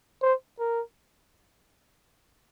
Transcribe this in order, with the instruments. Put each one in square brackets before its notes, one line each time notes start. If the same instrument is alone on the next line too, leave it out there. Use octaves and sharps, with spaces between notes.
[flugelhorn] C5
A#4